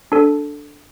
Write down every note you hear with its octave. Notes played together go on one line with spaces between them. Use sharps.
D4 A4